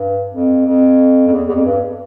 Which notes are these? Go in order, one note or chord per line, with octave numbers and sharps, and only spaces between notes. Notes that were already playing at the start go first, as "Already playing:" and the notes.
Already playing: G2
F2
F2
F2
E2
E2
F2
G2